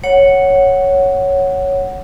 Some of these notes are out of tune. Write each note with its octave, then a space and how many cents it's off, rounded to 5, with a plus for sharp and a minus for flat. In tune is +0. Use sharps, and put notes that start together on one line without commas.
C#5 +0 F#5 +5